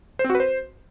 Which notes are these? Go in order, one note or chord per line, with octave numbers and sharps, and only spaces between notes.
C5
C4
F#4
B4
C5